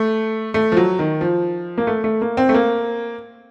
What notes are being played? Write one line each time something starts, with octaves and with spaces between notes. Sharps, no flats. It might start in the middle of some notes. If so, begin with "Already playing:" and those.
Already playing: A3
A3
F3
F#3
D#3
F3
A#3
A3
A3
A#3
C4
A3
A#3